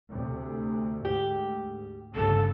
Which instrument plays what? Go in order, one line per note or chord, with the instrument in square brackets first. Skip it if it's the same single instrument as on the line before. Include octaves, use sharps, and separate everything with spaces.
[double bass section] D2 C3
[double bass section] D2 G#2 [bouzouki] G4
[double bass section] G1 C2 C#3 [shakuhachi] A4